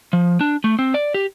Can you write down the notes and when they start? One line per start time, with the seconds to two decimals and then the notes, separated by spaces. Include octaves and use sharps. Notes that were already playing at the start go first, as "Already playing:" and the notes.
0.13 F3
0.41 D4
0.64 A3
0.79 C4
0.94 D5
1.14 G4